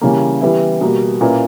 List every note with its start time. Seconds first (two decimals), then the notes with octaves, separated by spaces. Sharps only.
0.01 C#3 E3 G3 A#3
0.41 E3 G3 B3 E4
0.81 B2 G3 A#3
1.21 A#2 A#3 C#4 E4 B4